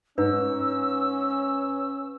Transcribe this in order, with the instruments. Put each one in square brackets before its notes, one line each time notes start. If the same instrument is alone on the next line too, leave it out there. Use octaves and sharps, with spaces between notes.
[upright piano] G#2 [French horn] C#4 [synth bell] B4 [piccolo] E6